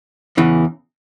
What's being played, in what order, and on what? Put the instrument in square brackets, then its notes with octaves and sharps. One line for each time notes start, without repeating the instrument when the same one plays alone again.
[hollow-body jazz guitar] E2 C#3 E3